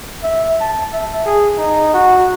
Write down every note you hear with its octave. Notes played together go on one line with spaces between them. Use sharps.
E5
A5
E5
G#4
D#4
F#4